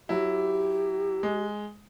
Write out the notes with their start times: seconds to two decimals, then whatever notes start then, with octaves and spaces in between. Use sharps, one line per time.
0.09 F#3 E4 G4
1.23 G#3